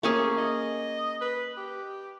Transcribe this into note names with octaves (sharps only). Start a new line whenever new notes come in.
A3 A#3 C#4 G#4
D#5
B4
G4